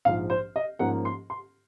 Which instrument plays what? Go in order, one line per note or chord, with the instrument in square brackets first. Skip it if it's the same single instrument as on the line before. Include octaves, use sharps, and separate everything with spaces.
[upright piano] A#1 G#2 F3 F5
C5
D#5
G#2 F3 A#3 C#4 F#5
C6
C6